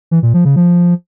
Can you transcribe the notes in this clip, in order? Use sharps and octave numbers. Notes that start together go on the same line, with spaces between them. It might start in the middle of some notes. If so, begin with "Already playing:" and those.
E3
A#2
F3
C#3
F3